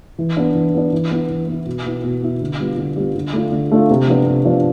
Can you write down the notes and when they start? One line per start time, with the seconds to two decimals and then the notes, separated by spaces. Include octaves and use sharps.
0.19 E3
0.37 B3 D4
0.55 E3
0.74 B3 D4
0.93 E3
1.11 B3 E4
1.29 E3
1.47 B3 E4
1.66 B2
1.85 B3 E4
2.03 B2
2.22 B3 E4
2.41 D3
2.59 G3 B3 F4
2.77 D3
2.96 G3 B3 F4
3.15 D3
3.33 A3 D4 F4
3.52 D3
3.72 A3 D4 F4
3.90 C3
4.08 F3 B3 D4
4.27 C3
4.45 F3 B3 D4